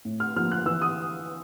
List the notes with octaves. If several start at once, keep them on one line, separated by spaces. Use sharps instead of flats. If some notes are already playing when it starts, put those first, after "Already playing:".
A2
F6
F3 A#3 F6
F#6
E3 E6
D#6